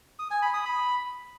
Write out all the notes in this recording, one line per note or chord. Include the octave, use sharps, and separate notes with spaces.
D#6
G#5
B5
D#6
B5